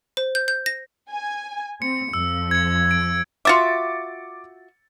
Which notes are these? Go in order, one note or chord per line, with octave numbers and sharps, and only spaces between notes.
C5
G6
G6
A#6
G#5
C4 C#7
F2 F3 E6
G#6 C#7
D7
F4 F#4 E5 D6 A6 C#7